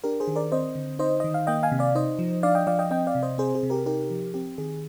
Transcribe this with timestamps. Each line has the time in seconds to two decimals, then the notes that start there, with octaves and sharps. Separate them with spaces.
0.04 D4 G4 A#4
0.20 G#4 C5
0.28 D#3
0.35 A#4 D5
0.52 C4 C5 D#5
0.75 D3
0.99 D#4 C5 D#5
1.20 D#3 D#5
1.34 F5
1.47 A#3 D#5 G5
1.63 F5 G#5
1.72 C3
1.79 D5 F5
1.95 D#4 C5 D#5
2.19 F3
2.43 D4 D5 F5
2.55 D#5 G5
2.67 F3 D5 F5
2.79 D#5 G5
2.91 C4 D#5 G5
3.07 D5 F5
3.15 C3
3.23 C5 D#5
3.38 C4 G#4 C5
3.55 G#4
3.63 C3
3.70 G4 A#4
3.86 D#4 G4 A#4
4.10 F3
4.34 C4 G4
4.58 D#3 G#4